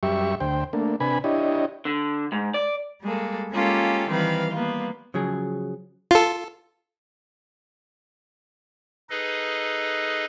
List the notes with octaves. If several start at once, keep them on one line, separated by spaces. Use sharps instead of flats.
F#2 G3 G4 E5 C#6
D2 C5 G5
A3 A#3 D4
C3 D4 B4 G#5 B5
D4 E4 G4 C#5 D#5
D3
G#2
D5
G3 G#3 A#3 A4
G#3 A#3 C#4 F4 G4 A4
D#3 E3 G3 C4 B4 F5
G3 A#3 B3 F4
C#3 F3 F#3 G#4
F4 A4
D#4 G#4 A4 B4 D#5